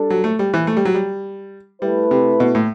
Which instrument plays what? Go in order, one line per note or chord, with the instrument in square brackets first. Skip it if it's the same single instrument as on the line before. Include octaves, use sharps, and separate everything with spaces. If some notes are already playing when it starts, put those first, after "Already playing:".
Already playing: [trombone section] G3 D4 A4
[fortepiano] F#3
A3
G3
E3
A3
G3
F#3
G3
[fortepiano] G3 [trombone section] A3 E4 B4
[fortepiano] C3
B2
A2